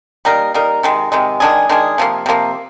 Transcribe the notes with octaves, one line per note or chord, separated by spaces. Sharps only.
G3 A#3 D#4 A#4
G3 A#3 D#4 A#4
C3 D#3 G#3
C3 D#3 G#3
D#3 G#3 D4 G#4
D#3 G#3 D4 G#4
C3 F3 A#3
C3 F3 A#3